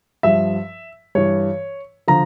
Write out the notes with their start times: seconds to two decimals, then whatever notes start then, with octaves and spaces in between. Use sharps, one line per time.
0.23 G2 F3 E5
1.15 G2 E3 C#5
2.08 D3 F3 A#5